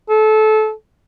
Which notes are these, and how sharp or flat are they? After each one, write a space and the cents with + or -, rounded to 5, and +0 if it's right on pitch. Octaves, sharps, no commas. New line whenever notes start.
A4 -25